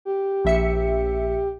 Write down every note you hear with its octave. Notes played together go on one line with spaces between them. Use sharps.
G4
A#1 E5 C#7